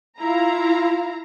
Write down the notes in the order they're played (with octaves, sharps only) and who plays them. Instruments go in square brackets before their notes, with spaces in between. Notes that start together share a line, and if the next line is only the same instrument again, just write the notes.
[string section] E4 F5 A#5 [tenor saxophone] F4